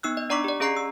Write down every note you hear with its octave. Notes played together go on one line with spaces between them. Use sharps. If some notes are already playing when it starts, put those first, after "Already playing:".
B3 D#4 E6 F#6
D#5
D4 D5 A#5 C#6 D6 B6
G4 D5
C#4 G#4 D#5 A#5 C#6 C7
E6